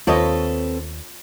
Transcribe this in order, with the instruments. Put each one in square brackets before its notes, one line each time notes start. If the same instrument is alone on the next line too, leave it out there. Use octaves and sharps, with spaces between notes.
[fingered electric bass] D#2 [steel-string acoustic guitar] C4 A4 B4 [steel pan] F4 C#5 D#5